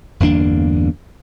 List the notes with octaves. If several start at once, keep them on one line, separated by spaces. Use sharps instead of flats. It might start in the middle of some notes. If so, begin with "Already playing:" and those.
G1 E2 A#3 D4